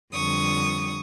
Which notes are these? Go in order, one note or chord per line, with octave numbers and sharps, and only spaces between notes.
F2 D3 G3 C#6 D#6